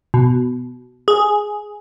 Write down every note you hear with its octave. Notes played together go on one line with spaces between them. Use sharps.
B2
G#4